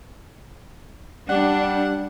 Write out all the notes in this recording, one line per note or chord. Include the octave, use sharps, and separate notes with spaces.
G3 D4 F#5